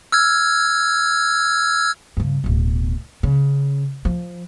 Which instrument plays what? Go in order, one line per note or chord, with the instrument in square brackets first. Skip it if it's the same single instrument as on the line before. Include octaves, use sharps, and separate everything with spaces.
[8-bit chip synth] E6 F6 G#6
[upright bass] G2 C#3
D1 B2
C#3
F3